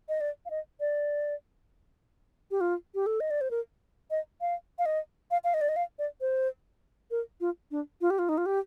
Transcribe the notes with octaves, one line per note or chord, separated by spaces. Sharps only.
D#5
D5
F5
D#5
D5
G4
F4
G4
A4
D#5
D5
C5
A#4
D#5
F5
F5
D#5
F5
F5
D#5
D5
D#5
F5
D5
C5
A#4
F4
D4
F4
G4
F4
D#4
F4
G4